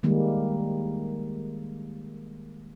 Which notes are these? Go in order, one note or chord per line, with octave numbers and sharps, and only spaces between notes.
D#3 G3 G#3 A#3